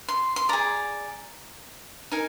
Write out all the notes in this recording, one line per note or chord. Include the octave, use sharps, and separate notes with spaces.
C6
C6
G#4 D5 A#5
D#4 A#4 G#5